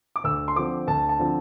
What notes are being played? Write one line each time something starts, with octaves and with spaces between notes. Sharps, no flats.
D6
D2 E6
C6
D3 F3 C4 D6
D2 A5
A5
D3 F3 C4